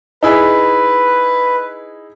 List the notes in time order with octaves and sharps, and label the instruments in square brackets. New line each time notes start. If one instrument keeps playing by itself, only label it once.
[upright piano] D#4 E4 G#4 [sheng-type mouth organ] B4